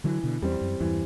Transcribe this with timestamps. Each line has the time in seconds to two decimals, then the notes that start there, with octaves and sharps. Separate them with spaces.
0.04 D3 E3 F#3
0.23 B2 D3
0.42 E2 G3 C4
0.61 F#2
0.80 E2 G2 E3